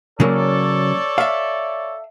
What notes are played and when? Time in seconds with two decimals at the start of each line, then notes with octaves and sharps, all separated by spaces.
0.20 C#3 F#3 A#3 A4 C#5 D5
1.18 E5 F5